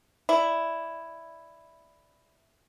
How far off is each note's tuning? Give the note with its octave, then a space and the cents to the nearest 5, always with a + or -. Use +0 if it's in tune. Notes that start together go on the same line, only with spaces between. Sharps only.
E4 +0 D5 +0